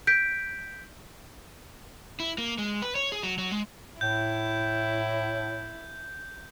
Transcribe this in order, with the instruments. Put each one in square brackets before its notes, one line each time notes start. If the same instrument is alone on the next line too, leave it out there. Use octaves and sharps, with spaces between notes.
[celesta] G6 B6 D7
[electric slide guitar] E4
A#3
G#3
B4
C#5
G#4
F#3
F#3
G#3
[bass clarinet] A2 [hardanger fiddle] E4 [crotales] G6